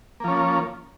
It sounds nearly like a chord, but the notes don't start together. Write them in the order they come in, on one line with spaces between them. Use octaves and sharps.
A#3 F3 C#4